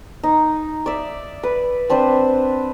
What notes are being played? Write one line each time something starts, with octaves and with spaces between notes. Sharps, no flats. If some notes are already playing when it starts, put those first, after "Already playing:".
D#4
D5 E5
B4
C4 D4 B4 C5